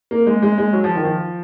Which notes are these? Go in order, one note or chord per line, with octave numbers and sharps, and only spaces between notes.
A#3
G#3
G#3
G#3
F#3
F3
D#3
F3